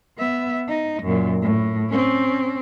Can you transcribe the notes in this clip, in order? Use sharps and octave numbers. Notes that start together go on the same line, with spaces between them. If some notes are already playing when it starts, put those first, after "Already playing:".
B3 E5
D#4
F#2 A#2
A2
C4 C#4